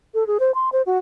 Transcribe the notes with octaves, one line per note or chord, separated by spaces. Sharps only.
A4
G#4
C5
C6
C5
F#4